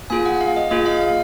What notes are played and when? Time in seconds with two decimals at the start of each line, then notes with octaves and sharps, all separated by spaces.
0.10 A#3 F4 G#4 G#5
0.26 F#5
0.41 F5
0.56 D#5
0.71 A#3 F4 G#4 D#5
0.86 F5
1.01 F5